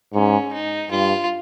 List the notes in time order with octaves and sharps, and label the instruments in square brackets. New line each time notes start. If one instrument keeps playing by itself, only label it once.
[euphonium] G#2 [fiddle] C#4
[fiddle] D#4
[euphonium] G2 [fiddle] F4